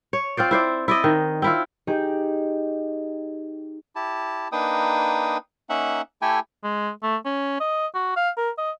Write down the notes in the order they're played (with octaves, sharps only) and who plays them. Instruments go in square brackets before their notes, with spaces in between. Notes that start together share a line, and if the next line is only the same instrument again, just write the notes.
[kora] C#5
C4 F4 C5 D5
E4 C5 D5
E4 D5 D#5
D#3
C4 E4 F4
[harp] D#4 G4 G#4
[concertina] E4 G4 A5
A#3 D4 D#4 B4 G5 D#6
A#3 C#4 D#4 E5 F#5
A3 E4 G4 A4 G5 G#5
[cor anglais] G#3
A3
C#4
D#5
F#4
F5
A#4
D#5